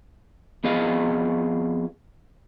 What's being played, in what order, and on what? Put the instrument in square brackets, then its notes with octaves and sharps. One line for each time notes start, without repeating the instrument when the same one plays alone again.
[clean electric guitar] F2 B3 G#4 D#5 F5